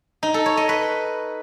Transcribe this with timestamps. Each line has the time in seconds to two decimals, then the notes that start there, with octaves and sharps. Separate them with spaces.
0.23 D#4
0.34 A4
0.46 C#5
0.57 D#5
0.69 B4